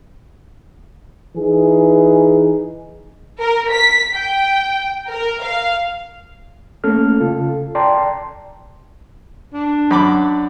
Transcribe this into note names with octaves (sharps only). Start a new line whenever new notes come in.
E3 D#4 G#4
A#4
B6
G5
A#4
F5
A3 A#3 C#4 A4 F6
C#3 F4 A4
D5 G5 A5 A#5 C6
D4
F#2 B5 D6